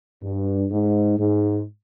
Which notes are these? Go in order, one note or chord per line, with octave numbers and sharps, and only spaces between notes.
G2
G#2
G#2